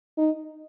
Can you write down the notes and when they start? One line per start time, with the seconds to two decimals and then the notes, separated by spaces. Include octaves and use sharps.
0.18 D#4